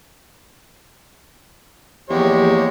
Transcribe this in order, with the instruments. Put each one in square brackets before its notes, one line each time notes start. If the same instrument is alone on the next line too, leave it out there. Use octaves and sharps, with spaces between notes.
[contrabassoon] E2 [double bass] F3 A#3 [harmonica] G#3 C#5 [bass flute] G4